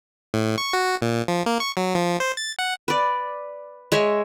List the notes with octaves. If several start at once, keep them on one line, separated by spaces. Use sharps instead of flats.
A2
C#6
F#4
A#2
F3
A#3
C#6
F#3
F3
C5
A6
F#5
B4 D5
G#3 C#5 E5